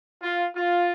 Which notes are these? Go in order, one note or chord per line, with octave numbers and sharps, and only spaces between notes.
F4
F4